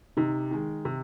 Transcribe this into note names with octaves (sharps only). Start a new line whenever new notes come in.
C3 D#4
D#3 G#3
C3